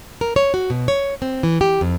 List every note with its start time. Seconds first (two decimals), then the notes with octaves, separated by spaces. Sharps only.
0.21 A#4
0.36 C#5
0.54 F#4
0.70 B2
0.88 C#5
1.22 C4
1.43 E3
1.61 G4
1.81 F2